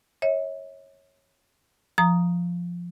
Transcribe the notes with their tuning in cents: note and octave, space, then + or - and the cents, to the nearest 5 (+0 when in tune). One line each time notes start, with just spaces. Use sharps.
C#5 -15 E5 -45
F3 +0 A#5 +0 D#6 +0